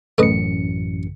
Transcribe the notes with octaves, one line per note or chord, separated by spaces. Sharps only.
A1 F#2 A3 B4 D#5 C#7